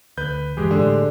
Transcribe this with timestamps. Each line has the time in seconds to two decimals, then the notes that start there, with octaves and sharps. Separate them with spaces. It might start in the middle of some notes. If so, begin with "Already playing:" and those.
0.18 D2 B4 G6
0.57 F#1 E3 G#3 G4 G#4
0.71 G#1 A2 D3